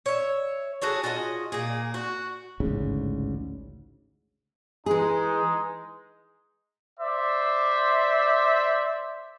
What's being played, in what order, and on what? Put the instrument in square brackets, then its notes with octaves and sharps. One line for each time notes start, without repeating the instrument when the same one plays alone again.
[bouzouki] C#5 E5
F#4 G#4 A4 C#5
F4 F#4 G#4 D#5
A#2 A#3 G#4
F#4
[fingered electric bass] A1 D2 G#2 C#3
[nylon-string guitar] E3 G#4 [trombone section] G#3 D#4
[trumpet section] C5 D5 E5